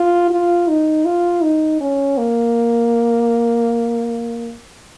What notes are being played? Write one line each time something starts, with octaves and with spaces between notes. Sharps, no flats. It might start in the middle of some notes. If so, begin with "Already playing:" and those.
Already playing: F4
F4
D#4
F4
D#4
C#4
A#3